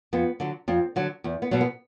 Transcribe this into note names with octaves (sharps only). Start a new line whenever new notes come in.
F2 B3
D3 F#3
F2 C4
D3 F#3
E2
B3
B2 F#3
B3